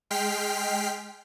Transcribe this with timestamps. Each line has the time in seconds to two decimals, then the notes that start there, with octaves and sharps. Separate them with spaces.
0.10 G#3 G5 F6 B6 C7